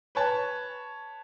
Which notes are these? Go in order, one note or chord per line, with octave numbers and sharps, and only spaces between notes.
B4 C#5 A5